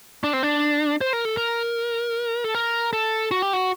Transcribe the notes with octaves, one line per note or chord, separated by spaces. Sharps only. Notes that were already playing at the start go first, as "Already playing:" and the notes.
D4
C4
D4
C5
A#4
A4
A#4
A4
A#4
A4
F#4
G4
F#4